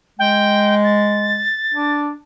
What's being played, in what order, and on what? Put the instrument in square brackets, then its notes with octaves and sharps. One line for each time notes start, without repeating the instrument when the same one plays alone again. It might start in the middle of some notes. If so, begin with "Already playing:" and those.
[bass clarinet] G#3 [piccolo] G5
[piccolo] A6
[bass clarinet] D4